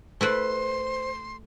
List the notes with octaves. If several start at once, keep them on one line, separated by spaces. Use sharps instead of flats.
A3 E4 B4 C5 C6